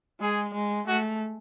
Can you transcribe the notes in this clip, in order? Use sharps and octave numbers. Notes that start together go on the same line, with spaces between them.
G#3 G#4
G#3
A3 F#4